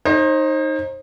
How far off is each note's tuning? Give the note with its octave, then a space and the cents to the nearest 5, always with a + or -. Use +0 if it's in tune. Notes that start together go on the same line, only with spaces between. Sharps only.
D#4 +0 C5 +35